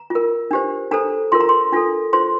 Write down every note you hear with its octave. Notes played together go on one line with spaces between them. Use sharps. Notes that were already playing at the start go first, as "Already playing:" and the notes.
Already playing: A#5
F4 A#4
D4 G4 C5
D4 A4 C5 A#5
F4 A#4 C6
A#5
C6
D4 F4 A4
F4 C5 C6